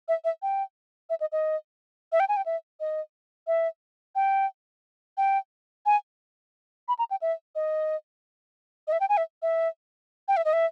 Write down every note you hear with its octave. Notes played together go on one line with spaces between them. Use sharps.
E5
E5
G5
E5
D#5
D#5
E5
G5
G#5
G5
E5
D#5
E5
G5
G5
G#5
B5
A#5
G5
E5
D#5
D#5
E5
G5
G#5
E5
E5
G5
E5
D#5
E5